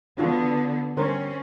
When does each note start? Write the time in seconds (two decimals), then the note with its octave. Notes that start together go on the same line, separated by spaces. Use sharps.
0.18 D3 B3 D4 F4 F#4
0.97 D3 G3 C4 C#4 A#4 C5